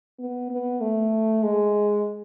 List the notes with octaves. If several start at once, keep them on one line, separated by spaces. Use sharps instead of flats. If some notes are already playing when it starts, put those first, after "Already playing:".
B3
B3
A3
G#3